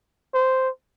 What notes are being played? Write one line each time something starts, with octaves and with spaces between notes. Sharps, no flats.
C5